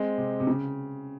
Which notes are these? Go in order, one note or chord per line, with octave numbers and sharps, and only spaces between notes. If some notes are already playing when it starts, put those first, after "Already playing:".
Already playing: G#3 C4
C3
C3
C#3